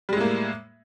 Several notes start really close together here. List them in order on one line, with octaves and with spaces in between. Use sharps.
G3 G#3 A2 A#3